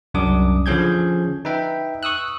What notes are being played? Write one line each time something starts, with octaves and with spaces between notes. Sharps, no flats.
C2 F#2 D4 D6 D#6
D3 F3 C#4 G#4 G6 G#6
D#4 B4 E5 G5
C#6 D#6 E6 F#6